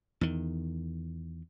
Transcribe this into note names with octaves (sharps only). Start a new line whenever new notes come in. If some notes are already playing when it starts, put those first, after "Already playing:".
E2 D#3